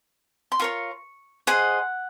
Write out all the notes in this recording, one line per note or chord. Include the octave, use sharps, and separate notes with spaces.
C6
F4 A#4 C#5 C#6
G#4 C5 D#5 F#5